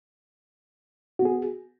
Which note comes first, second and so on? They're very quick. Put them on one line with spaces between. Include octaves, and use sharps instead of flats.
F#4 B3 G#4